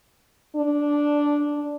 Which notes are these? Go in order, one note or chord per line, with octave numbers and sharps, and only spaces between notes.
D4